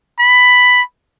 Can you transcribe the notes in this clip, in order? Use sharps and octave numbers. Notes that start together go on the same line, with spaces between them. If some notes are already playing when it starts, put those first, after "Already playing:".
B5